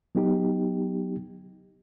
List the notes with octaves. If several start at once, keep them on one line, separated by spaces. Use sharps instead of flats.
F#3 B3 D#4 G4